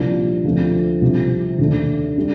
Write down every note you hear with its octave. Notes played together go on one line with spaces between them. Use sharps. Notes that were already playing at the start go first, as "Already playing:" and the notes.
Already playing: C2 A#2 F3 A#3 D4
D2 D3 F3 A3 C4
C2 C3 F3
D#2 D3 A3 D4
D3 G3